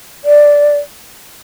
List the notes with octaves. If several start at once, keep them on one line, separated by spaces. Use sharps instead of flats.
D5